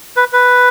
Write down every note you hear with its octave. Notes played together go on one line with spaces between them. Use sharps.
B4
B4